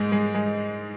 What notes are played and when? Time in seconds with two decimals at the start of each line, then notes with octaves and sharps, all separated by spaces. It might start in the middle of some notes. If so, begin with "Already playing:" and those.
Already playing: G#2 G#3 D#4
0.12 G#3
0.35 G#3